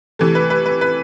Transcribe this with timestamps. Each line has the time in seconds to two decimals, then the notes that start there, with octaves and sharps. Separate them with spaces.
0.19 C3 E3 A3
0.35 B4
0.50 B4
0.66 B4
0.81 B4